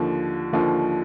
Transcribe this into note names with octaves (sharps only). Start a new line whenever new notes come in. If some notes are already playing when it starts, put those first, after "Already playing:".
Already playing: D#2 D3 F3
D#2 D3 F3